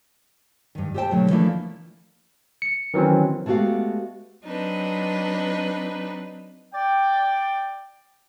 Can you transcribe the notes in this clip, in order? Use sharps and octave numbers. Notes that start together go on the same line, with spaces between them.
G2 D#3
G4 A4 C5 D#5 G5 A5
B2 D3 F#3 G3 A3
E3 F3 A3 A#3 D4 E4
C#7
D#3 E3 F#3 C4 C#4
G#3 A3 B3 F#4 G4 F5
F#3 C4 D4 D#4 B4
D5 G5